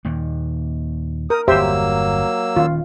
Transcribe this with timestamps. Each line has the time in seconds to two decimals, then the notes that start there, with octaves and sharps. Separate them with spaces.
0.05 D#2 A#2 D#3
1.30 A#4 D#6
1.48 G1 E2 F#3 A#3 G4 C5 E5 E6
2.56 D#1 D#3 C#4 F4